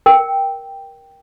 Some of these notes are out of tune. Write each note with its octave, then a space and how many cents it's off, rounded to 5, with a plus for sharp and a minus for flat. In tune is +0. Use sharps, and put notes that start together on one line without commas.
A#4 +15 G5 +0